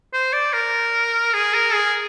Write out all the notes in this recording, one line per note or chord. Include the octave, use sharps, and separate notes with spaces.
C5
D5
A#4
G#4
A#4
G#4